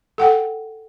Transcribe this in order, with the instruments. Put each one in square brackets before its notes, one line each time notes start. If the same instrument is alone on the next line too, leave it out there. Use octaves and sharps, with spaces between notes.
[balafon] A4 F#5 G5